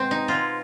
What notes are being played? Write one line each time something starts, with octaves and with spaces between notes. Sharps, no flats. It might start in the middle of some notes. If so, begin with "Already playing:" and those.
Already playing: B2 G#3 C4
D#4
B2 G#3 F4